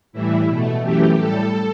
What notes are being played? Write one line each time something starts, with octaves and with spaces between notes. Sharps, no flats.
A2 E3 G3 E4
B2 A3
F#2 E3 A3 G4
A2 G3 A4